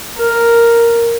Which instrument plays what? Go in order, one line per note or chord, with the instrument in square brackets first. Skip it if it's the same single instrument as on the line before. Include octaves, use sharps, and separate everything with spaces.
[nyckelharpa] A#4